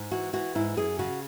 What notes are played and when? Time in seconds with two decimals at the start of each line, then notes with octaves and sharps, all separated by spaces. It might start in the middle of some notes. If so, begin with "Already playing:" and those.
Already playing: G#2
0.11 E3 F#4
0.33 E3 F#4
0.55 G#2 E4
0.77 F#2 G#4
0.99 C#3 F#4